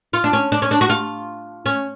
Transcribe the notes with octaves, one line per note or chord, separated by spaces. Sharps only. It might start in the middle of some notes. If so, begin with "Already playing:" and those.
F4
D4
C#4
D4
C#4
D4
F#4
F4
C#4